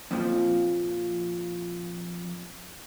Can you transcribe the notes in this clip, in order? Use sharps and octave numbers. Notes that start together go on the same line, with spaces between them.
F2 A#2 F3